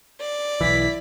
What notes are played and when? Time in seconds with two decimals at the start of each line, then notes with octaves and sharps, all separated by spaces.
0.20 D5
0.61 B1 E3 E4 B6